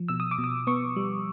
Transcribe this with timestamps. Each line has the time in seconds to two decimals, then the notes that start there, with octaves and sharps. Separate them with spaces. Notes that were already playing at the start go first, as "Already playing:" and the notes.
Already playing: F3
0.08 B2 E6
0.20 D#6
0.31 D6
0.38 B2
0.44 D#6
0.67 B3 C#6
0.96 G3